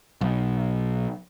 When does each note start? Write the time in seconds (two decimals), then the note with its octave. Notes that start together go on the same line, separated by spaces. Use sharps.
0.21 B1